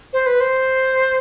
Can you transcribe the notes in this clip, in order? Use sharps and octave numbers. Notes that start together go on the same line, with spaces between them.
C5
B4
C5